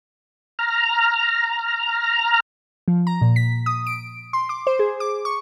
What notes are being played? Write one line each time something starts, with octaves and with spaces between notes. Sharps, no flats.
A#5 F6
F3
A#5
A#2
B6
D#6
D7
C6
D6
C5
G#4
D6
C#6